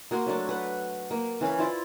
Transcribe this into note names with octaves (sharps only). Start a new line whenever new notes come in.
A#3 F#4 A#4 C6
F#3 A3 D4
B4 F#5
A#3
E3 C#4 F5 B5
E4 F4 C5 D5